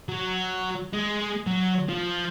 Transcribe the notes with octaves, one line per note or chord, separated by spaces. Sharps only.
F#3
G#3
F#3
F3